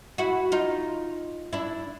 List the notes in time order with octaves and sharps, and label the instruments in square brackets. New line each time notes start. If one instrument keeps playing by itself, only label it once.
[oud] E4 F#4
D#4 F4
D4 E4